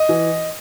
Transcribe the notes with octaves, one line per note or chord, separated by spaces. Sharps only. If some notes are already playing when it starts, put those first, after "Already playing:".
Already playing: D#5
E3